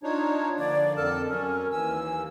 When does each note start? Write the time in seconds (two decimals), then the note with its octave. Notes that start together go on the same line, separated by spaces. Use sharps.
0.03 D4 D#4 F4 C#5
0.58 D3 F3 A#3 D5
0.96 F2 A4 A#4 A5
1.28 F#3 C#4
1.72 D#2 E3 G#5 E6